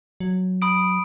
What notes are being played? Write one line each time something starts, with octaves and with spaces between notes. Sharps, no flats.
F#3
B5 D#6 D7